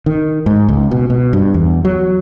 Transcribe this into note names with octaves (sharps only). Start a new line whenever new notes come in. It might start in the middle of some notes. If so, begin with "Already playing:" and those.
D#3
G#2
C#2
B2
B2
G2
E2
F#3